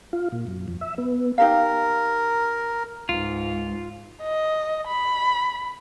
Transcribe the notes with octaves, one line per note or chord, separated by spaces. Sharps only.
F4
A#2
F#2
F2
E5
B3
D#4 G4 A#4 F5
C#2 G#2 F4
D#5
B5